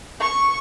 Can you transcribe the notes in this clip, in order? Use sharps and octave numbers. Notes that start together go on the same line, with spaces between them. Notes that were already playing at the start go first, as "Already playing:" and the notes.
C#6